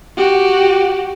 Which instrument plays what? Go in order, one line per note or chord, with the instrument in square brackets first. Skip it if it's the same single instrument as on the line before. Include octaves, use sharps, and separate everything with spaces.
[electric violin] F#4 G4